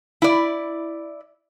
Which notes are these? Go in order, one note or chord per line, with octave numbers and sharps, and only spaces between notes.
E4 D5